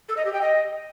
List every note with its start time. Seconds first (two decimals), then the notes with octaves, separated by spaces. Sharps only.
0.08 A4
0.17 D#5
0.25 G4
0.33 G5
0.41 D#5